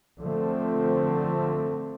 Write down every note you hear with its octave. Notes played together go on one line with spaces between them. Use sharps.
D3 F3 A3 C4